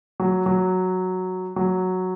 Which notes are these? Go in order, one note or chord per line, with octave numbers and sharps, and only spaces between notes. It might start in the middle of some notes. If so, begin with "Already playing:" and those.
F#3
F#3
F#3